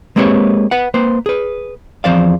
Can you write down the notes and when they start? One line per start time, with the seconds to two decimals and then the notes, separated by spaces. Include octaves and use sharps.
0.16 G#3 A#3 C4 G4 B4 C#5
0.71 B4 F#5
0.94 A#3 B4 C5
1.26 G#4 B4
2.04 E2 F3 C4 C5 D5 F5